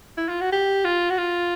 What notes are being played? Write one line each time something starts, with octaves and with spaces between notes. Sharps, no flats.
E4
F4
F#4
G4
F4
F#4
F4